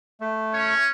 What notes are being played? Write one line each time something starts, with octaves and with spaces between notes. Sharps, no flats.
A3
C#4 C#5